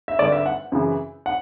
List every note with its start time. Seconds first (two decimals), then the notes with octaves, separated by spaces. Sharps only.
0.08 E5
0.19 D3 D5
0.23 G2
0.32 E5
0.46 F#5
0.72 F#2 C#3 E3
1.26 F#5